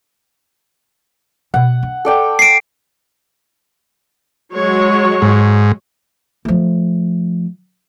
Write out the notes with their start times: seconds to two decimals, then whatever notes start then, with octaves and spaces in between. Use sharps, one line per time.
1.54 B2 F#5
1.83 D4
2.05 A4 D5 G5
2.39 C7 D7
4.53 F#3 G#3 C#5
5.22 G#2
6.45 F3 A3